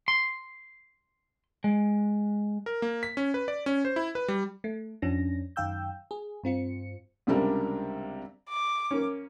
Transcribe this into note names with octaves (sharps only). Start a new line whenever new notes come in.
C6
G#3
A#4
A#3
B6
C#4
B4
D5
C#4
C5
E4
B4
G3
A3
F2 F3 C#4 D4 A#6
F#2 D#3 F5 G5 E6 G6
G#4
G2 C4 F4 C#7
C#2 C3 G3 D4 A#4
D6
A#3 C#4